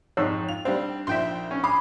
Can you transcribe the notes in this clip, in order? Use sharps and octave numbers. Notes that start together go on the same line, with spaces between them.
F2 G#2 C#5 C#6 E6
F4 F7
G3 C4 D4
A#1 F3 E5 G5 C6
C#4
B5 D6 D#6 C7